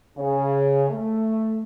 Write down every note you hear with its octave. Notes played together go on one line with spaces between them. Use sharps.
C#3
A3